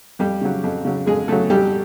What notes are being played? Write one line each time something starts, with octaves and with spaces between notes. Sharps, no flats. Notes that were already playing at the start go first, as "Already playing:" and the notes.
F2 G3 G4
C#3 F#3
F2
C#3 F#3
F2 G#3 G#4
C#3 F#3 A3 A4
F2 G3 G4